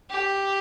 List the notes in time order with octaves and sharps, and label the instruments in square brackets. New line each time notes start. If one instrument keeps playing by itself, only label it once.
[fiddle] G4